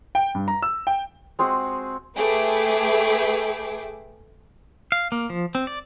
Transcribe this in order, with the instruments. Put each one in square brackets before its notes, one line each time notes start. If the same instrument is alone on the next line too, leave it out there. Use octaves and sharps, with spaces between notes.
[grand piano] G5
G2
A#5
E6
G5
[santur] G#3 C4 F#4 G#4
[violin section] A3 G#4 B4 E5 G5 D6
[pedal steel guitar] F5
A#3
F3
C4
D5